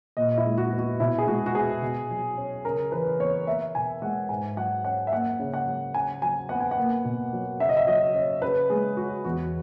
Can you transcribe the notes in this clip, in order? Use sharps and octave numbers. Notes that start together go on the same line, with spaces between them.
A#2 D#5
E4
G#3
F#4
B3
F#4
B2 E4
G#4
G#3 F#4
F#4
B3 G#4
B2
F#3
C#4
C#3 A#4
E3 B4
B3 C#5
B3 E5
B2 G#5
G#3 F#5
G#2 G#5
F#3 F#5
C#4 F#5
E5
A#3 F#5
C#3
F#5
F#3
C#3 G#5
F#3 G#5
B3 F#5
G#5
F#5
A#3
B2
F#3
C#3 E5
D#5
E5
F#3 D#5
C#4 D#5
C#3 B4
G#3 G#4
C#4 F#4
E2 F#4